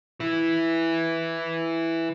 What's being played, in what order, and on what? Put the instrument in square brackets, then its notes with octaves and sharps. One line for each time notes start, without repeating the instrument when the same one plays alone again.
[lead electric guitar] E3 E4